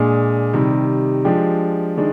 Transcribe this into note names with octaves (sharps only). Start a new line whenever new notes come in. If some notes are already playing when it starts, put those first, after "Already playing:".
Already playing: A#2 G#3 D4 G#4
C3 D#3 G3
F3 G#3 D4 G4
D#3 G#3 D4